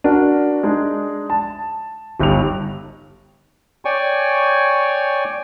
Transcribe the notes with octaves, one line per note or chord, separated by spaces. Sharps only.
D4 F#4 A#4
G#3 D4 D#4 G#4
A5
G1 G2 D#4 F7
C#5 D5 G5 G#5 C#6